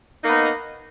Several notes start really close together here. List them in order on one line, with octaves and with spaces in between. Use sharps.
D#4 A#3 B3